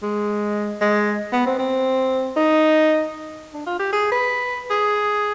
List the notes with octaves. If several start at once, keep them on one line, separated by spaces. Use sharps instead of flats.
G#3
G#3
B3
C4
C4
D#4
D4
F4
G4
G#4
B4
G#4